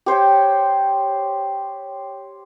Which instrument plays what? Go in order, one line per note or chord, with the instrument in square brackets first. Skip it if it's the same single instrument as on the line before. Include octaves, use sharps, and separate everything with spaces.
[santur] G4 C5 C#5 G5